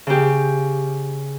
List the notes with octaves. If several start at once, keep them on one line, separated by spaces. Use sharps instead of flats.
C#3 G4